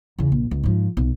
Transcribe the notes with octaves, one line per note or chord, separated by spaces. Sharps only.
E2 C#3
A#1
C#2
G#2 F3
B1